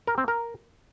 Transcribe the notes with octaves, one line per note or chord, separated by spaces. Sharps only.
A#4
C4
A#4